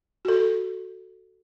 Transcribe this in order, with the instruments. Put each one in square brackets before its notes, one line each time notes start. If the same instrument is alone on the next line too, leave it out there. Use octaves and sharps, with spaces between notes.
[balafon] F#4 A4